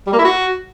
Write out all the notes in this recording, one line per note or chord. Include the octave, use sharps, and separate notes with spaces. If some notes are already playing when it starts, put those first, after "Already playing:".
G3
A#3
E4
F#4